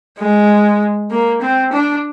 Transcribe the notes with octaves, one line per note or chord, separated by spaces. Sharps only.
G#3
A#3
C4
D4